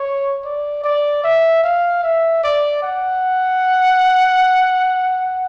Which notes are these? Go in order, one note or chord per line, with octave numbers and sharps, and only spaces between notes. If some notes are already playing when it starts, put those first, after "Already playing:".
Already playing: C#5
D5
D5
E5
F5
E5
D5
F#5